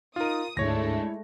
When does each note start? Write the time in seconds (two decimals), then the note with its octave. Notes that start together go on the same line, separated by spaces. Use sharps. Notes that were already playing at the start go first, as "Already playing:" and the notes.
0.16 D#4 F4 A#4 D#6
0.57 D2 G#2 G#3 A3 D4 E4 C#5 A#6